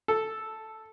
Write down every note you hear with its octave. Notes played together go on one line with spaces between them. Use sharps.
A4